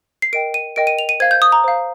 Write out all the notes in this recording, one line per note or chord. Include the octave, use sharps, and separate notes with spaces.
C7
A#4 D#5 G5 D7
D#7
A#4 D#5 G5 D7
D#7
F7
D#7
C5 F5 G#6
G6
D#6
A#5
C5 F5